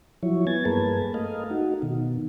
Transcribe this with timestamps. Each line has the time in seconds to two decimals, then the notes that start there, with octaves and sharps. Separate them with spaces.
0.23 F3 F#3 E4 C#5
0.47 B3 G#5 G#6 A6
0.65 G2 A#3 G#4 A#4 B4 A5
1.14 A3 A#4 D#5 F5
1.50 D#4 F#4
1.82 B2 D#3